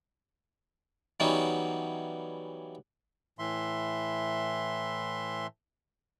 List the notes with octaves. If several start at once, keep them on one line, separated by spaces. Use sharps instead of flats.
E3 F#3 G3 B3 C#4 D#4
A2 E3 E5 C6